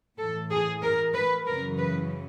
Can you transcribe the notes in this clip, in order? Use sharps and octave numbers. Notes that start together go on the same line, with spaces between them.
A2 E3 A4
G#4
A#4
B4
F#2 C#3 E3 A#4
B4